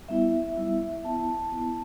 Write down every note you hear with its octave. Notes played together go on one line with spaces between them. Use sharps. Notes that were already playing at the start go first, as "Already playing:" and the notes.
G3 B3 E4 E5
G3 B3 E4
B3 E4 A5
B3 E4